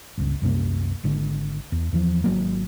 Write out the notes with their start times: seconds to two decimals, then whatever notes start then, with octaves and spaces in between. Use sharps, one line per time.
0.17 G1 C#2
0.42 C2 F#2 C3 A#3
1.04 G#1 D3
1.72 E2
1.92 E2 E3 F3
2.24 G#1 F#3 A#3